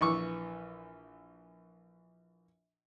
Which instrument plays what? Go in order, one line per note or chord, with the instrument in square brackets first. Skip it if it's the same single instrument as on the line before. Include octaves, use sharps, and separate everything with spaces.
[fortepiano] A#1 E3 C#6 D6